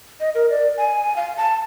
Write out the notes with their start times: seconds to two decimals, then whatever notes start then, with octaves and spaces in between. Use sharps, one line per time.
0.20 D#5
0.35 A#4
0.50 D5
0.78 G#5
1.16 F5
1.37 A5